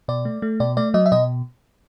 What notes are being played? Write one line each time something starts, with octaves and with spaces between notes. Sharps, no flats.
B2 D5
A3
A3
B2 D5
A3 D5
F#3 D#5
E5
B2 D#5